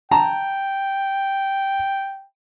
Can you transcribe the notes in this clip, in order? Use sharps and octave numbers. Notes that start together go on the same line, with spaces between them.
G5 A5 A#5